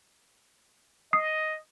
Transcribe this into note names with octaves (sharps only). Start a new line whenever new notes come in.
D#5 D#6 C7